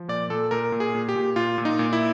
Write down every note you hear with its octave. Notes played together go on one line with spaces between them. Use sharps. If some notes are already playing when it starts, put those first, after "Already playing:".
Already playing: F3
A#2 D5
A#2 A4
A#2 A#4
A#2
G#4
A#2
G4
A#2
A#2 F4
A#2
D#4
A#2
E4